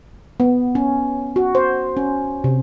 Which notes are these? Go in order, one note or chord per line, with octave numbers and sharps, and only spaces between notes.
B3
C#4
F#4
C5
C#4
C3